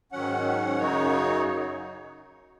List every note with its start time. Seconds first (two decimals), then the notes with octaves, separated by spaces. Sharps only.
0.12 G#2 D#3 F#3 C#4 F#5
0.77 F#2 C#3 F#3 D#4 C#5